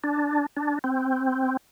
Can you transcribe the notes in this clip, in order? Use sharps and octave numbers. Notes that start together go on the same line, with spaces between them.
D4
D4
C4